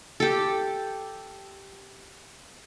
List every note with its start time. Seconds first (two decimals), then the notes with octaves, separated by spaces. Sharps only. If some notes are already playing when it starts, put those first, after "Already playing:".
0.20 G4 A4